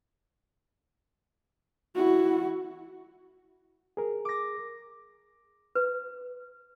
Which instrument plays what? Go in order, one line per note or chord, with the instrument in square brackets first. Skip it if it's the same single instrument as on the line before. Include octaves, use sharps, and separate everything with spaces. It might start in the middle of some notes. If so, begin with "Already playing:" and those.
[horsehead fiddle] E4 F#4
[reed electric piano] G#4 A#4
[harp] D6 A#6
[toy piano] B4